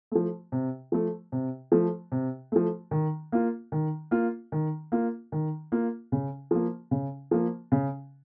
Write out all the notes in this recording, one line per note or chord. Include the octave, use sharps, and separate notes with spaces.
F3 A3
C3
F3 A3
C3
F3 A3
C3
F3 A3
D#3
A#3 F4
D#3
A#3 F4
D#3
A#3 F4
D#3
A#3 F4
C#3
F3 A#3
C#3
F3 A#3
C#3